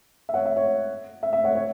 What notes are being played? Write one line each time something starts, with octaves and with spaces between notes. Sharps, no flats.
E5
C#5 F#5
E5
C#5
E5
E5
C#5 F#5
C#5